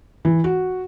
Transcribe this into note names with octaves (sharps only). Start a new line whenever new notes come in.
E3
F#4